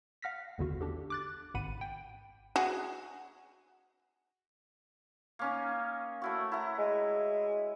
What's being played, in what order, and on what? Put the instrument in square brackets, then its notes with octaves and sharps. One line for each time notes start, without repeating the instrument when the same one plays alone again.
[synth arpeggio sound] F5 F#5 F6 A#6 B6
G#1 E2 D3 F#4
D4 G4 A4
D6 F#6 A6
G#1 G#2 F#5 B5 D#7
G5
[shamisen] F#4 G#4
[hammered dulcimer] A#3 C#4 D#4
A3 E4 F#4
E4 F#5 A#5
[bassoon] G#3